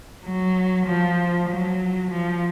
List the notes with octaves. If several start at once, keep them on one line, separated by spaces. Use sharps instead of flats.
F#3
F3
F#3
F3